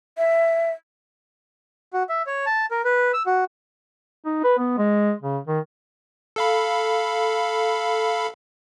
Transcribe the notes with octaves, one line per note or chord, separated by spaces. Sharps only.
E5
F#4
E5
C#5
A5
A#4
B4
E6
F#4
D#4
B4
B3
G#3
C#3
D#3
A4 F5 B5